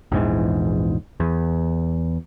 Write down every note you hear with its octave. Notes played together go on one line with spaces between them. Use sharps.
A#1 E2 G#2 E3
E2